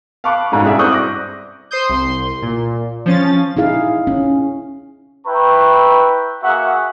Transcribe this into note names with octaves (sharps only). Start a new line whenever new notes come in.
F5 A5 B5 C#6 D6 F#6
G#2 B2 G3 C#4
D4 E4 F#4 G#4 D5 E5
G2 C4 C#6 D#6 F#6 G6
D6 A#6
C5 C6 D#6 G6
C2 C6
A#2
F3 C#4 A6
D#4 E4 G#4 F5
C#4
E4 B4 G5 A#5 C#6
A#3 F#4 G#4 E5 F#5